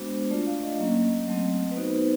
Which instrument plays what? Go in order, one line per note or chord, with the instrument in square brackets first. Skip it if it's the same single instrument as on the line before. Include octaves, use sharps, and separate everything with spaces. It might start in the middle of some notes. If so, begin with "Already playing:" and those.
Already playing: [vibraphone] G#3 B3 D4 F#4 C5
A3 D4 F4 D5
F5
D#5
F#3 A#3 C#4 D#5
F#3 A3 C4
B4
B3 D#4 F#4 C5